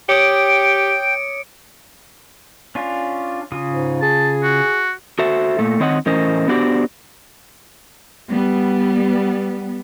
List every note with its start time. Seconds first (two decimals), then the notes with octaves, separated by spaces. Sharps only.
0.09 G4 C#5 G5 D6 D#6 C#7 D7
2.75 C#4 D4 F4
3.52 C#3 F4 D#6
3.70 G#2
4.02 G#4 A5
4.43 F#4
5.19 F#4 A4 C5 E5
5.59 A#2 A3
5.80 D#3 C4 C#5 D#5 F5 F#5
6.06 A2 E3 C#4 A#4 C5 D#5
6.48 B3 D4 F#4 G4 C5 D5
8.30 G3 B3